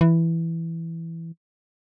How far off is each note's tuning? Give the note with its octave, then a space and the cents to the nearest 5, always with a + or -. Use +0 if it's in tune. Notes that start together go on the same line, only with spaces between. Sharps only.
E3 +5